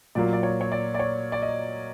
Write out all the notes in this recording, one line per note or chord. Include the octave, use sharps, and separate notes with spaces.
A#2 F#3 A#3 D5
D5
C#5
C#5
D5
D5
C#5
D5
D#5